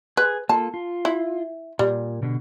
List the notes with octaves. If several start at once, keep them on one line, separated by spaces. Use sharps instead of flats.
G#4 B4
A#3 F4 A4 A5
F4
E4
A#2 G3
B2 D3